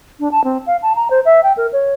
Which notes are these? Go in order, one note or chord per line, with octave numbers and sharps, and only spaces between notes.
D4
A5
C4
F5
A5
A#5
C5
E5
G5
A#4
C#5